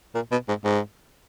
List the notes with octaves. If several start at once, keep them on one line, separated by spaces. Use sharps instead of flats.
A#2
B2
G#2
G#2